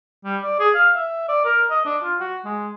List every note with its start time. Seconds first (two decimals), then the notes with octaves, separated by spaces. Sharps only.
0.24 G3
0.42 D5
0.59 G#4
0.75 F5
0.95 E5
1.28 D5
1.45 A#4
1.70 D#5
1.85 D4
2.03 F4
2.20 F#4
2.45 G#3